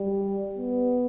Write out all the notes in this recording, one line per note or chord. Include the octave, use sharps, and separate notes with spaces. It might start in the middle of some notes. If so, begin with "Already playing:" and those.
Already playing: G3
B3